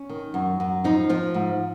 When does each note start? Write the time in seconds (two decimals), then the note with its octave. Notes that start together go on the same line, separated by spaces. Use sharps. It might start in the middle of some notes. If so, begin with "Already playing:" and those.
Already playing: C#4
0.10 D#3
0.34 F#2
0.60 F#2
0.84 F3 D#4
1.09 F3 F4
1.34 G#2